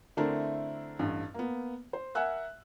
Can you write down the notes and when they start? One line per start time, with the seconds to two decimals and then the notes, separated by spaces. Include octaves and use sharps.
0.17 D3 A3 C4 D4 E4 A#4
0.99 A1 G2
1.34 A#3 B3
1.93 C5
2.15 A#4 E5 F#5 G#5 E6 F#6